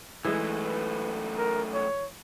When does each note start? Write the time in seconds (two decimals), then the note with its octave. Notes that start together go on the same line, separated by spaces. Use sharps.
0.25 F#2 E3 G#3 A3
0.63 B4
1.38 A#4
1.74 C#5